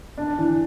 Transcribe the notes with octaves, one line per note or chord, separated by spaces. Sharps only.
D4
E3